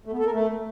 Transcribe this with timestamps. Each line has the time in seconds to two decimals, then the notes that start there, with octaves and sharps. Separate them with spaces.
0.05 A3
0.12 B3
0.19 A4
0.26 A#4
0.32 A3